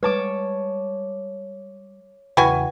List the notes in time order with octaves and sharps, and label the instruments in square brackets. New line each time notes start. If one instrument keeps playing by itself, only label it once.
[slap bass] G3 G#3 [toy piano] B4 [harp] C#5 A5 D6
[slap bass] E2 C#3 [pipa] E4 F#4 G#5 [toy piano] B4 G5